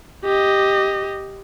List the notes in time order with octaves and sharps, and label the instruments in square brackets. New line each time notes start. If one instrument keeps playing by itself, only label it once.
[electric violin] G4 D#5